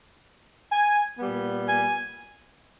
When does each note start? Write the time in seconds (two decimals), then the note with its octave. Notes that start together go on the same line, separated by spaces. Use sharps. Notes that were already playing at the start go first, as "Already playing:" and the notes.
0.72 G#5
1.19 A#2 G3 B3
1.66 G#5